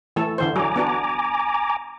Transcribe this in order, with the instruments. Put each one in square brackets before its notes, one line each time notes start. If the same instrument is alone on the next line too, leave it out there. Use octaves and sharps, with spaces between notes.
[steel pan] E3 A3 A4
D3 E3 C5
[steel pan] F#3 [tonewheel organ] G#5 A#5 D6
[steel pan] B3 D4 F#4